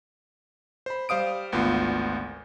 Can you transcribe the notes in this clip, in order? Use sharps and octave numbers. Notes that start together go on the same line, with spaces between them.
C5 B5
G3 C5 F5 D#6 D7
G#1 D2 B3 F4